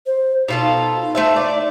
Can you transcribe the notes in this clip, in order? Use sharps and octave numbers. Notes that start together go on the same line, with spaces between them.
C5
B2 D#4 F4 A4
A3 C5 E5
D5